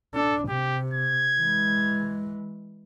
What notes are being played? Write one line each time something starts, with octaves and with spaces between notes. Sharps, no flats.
D4 A4
C3 G4
G#6
E3 G#3